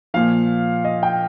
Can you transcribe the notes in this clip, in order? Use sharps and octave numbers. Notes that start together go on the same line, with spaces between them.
A#2 F3 F5
D#5
G5